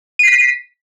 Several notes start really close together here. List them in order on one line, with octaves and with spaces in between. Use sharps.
D#7 C7 B6